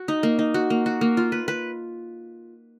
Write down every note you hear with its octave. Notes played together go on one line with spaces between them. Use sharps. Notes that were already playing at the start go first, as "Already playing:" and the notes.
Already playing: F#4
D#4
A#3
D#4
F#4
A#3
F#4
A#3
F4
B4
B4